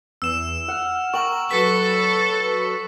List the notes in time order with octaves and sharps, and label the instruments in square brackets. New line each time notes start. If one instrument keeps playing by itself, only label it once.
[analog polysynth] E2 [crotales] E6 E7
[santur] F#5 [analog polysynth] F6
[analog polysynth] A#4 [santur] G5 [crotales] C#6 F#7
[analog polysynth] F#3 B4 [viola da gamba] A4 [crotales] B6